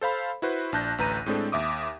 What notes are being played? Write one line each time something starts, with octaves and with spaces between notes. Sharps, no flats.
A4 C5 F5 B5
E4 F#4 B4 C5
A#1 D4 A5 F#6 G6 A#6
A1 D2 B4 A#5 G6 D#7
A2 G#3 C4 D4 A4
D#2 E5 D6 D#6